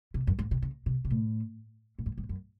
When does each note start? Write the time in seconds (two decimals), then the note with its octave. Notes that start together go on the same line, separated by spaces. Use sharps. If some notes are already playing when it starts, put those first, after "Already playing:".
0.14 C3
0.27 F#2
0.39 G#2
0.51 C3
0.62 C#3
0.86 C3
1.05 C3
1.10 A2
1.99 A2
2.06 G#2
2.18 G#2
2.29 F#2